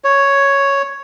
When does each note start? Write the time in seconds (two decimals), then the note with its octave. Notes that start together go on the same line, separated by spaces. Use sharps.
0.04 C#5